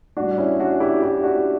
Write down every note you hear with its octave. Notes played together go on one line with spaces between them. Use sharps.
A2 G3 D4 F#4
C#4 E4
D4 F#4
E4 G4
E4 G4
D4 F#4